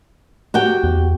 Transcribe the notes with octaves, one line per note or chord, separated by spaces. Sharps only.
F#4 G4 G5
E2